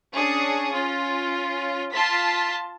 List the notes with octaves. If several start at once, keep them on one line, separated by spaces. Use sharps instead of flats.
C#4 D4 G#4 C#6 D#6
C#4 F4
F4 A5 C6 B6